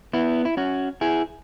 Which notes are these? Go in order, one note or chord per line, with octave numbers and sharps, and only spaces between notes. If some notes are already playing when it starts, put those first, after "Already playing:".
B3 E4
E4
C#4 F#4
E4 G#4